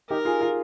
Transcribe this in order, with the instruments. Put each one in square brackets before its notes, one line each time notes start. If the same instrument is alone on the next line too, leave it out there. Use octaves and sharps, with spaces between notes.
[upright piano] D#4 G4 [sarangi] A#4
[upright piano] F4 G#4
F4 G#4